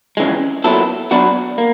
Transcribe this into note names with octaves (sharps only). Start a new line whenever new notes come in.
F2 C#3 E3 G#3
A#2 F#3 B3 E4 A4
F#3 B3 D4 F#4 B4
A#3